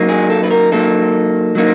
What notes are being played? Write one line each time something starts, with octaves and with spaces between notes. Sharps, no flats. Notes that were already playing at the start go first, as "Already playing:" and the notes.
Already playing: F#3 A#3 D#4
G#4
A4
B4
A#4
F#3 A#3 D#4 A4
F#3 A#3 D#4